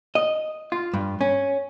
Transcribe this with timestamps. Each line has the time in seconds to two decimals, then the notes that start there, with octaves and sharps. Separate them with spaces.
0.15 D#5
0.72 F4
0.94 G2
1.21 C#4